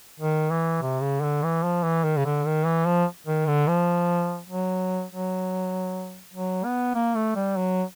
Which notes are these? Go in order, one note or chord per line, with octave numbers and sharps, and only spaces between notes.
D#3
E3
C3
C#3
D3
E3
F3
E3
D#3
C#3
D3
D#3
E3
F3
D#3
D3
F3
F#3
F#3
F#3
B3
A#3
A3
G3
F#3